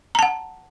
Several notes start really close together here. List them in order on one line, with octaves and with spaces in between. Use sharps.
A#5 A5 F#5